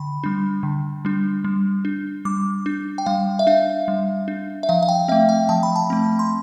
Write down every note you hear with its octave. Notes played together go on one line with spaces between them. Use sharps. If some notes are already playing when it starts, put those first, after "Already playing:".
Already playing: D3 B5
G3 D4
D3
G3 D4
G3
D4
G3 D6
D4
G5
G3 F5
E5
D4 F5
G3
D4
E5
F3 F5
F5
G5
A3 C4 E5
G5
F3 A5
B5
A5
A3 C4
C6